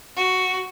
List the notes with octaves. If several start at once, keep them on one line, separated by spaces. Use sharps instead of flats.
F#4